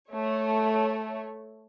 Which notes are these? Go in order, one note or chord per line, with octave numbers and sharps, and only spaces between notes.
A3 C#5